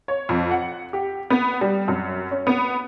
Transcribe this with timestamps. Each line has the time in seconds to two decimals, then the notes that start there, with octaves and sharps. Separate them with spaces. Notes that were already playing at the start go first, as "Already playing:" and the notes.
0.08 C#5
0.29 F2
0.51 F#5
0.93 G4
1.30 B3
1.61 G3
1.88 F#2
2.31 C#4
2.47 B3